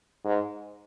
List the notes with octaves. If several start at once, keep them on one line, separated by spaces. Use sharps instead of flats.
G#2